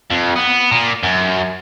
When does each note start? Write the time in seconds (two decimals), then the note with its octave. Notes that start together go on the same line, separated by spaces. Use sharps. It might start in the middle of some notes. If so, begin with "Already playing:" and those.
0.11 F2
0.36 B3
0.71 A#2
1.03 F#2